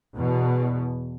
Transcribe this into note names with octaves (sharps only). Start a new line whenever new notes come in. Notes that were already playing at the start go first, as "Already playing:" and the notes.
E2 B2